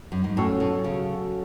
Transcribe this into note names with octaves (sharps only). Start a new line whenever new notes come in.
F#2
G#2
A2 F#3 C#4 F#4 A4
B2
C#3